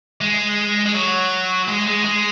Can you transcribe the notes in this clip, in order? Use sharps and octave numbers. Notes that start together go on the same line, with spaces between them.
G#3
G#3
F#3
G#3
G#3
G#3